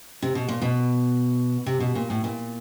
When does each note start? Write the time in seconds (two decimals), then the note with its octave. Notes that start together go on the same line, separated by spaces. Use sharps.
0.22 C3
0.35 B2
0.48 A#2
0.62 B2
1.66 C3
1.80 B2
1.95 A#2
2.10 A2
2.24 A#2